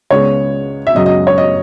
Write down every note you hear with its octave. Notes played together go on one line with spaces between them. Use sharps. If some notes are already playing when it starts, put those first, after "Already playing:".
C#2 C#3 G#3 B3 C#5
E5
F#2 C#3 F#3 D#5
D#5
C#5
D#5